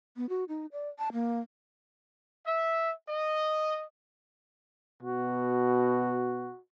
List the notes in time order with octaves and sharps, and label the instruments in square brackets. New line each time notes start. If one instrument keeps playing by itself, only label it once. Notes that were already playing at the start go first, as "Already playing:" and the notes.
[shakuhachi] B3
F#4
D#4
D5
A5
A#3
[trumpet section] E5
D#5
[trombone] B2 [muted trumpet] F#4